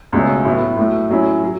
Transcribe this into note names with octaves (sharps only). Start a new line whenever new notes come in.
C#2 B2 A3 C#4
A2 F#3 B3 E4
A2 F#3 A3
A2 F#3 C#4 E4
F#3